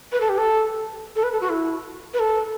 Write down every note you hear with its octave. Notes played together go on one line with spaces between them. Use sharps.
B4
A4
G4
A4
A4
B4
A4
F#4
E4
B4
A4